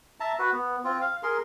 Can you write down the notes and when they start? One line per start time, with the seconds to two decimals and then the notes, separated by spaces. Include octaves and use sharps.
0.20 E5 A5 A#5
0.39 F#4 B4
0.52 B3
0.84 C4 F4
1.01 F5
1.23 G#4 A#4 C6